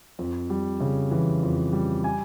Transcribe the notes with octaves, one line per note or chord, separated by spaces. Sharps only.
F2
G3
C#3
E3
F2
G3
G#5